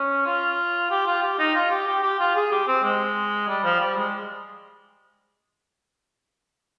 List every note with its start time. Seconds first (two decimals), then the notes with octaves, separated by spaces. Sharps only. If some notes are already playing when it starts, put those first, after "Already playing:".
Already playing: C#4
0.26 F4
0.90 G4
1.06 F4
1.22 G4
1.39 D#4
1.54 F4
1.70 G4
1.87 G4
2.03 G4
2.20 F4
2.35 G#4
2.51 G4
2.67 C4
2.83 G#3
3.48 G3
3.64 F3
3.80 G3
3.96 G#3